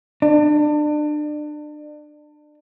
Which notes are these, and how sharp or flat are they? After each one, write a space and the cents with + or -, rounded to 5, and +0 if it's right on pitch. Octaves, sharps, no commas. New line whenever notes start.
D4 +30